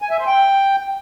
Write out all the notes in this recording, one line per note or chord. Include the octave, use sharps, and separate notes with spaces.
G#5
E5
C5
G5